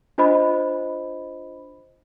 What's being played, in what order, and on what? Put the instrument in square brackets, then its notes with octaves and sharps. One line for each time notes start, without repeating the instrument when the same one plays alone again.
[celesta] D4 F4 C5 D#5 B5